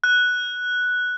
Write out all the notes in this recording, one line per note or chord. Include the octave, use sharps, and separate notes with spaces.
F#6